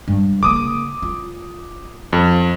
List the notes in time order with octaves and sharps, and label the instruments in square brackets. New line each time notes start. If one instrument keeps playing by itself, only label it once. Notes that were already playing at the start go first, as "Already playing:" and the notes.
[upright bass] G2
[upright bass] C#3 A#3 [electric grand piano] D6 D#6
[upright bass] F4
[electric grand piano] F2